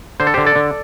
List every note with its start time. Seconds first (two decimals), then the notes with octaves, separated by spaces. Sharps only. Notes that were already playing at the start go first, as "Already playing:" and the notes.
0.20 D3 C5
0.27 A4
0.34 D3 G4 C5
0.46 A4 D5
0.56 D3